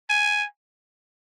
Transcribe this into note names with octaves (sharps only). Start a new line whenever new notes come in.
G#5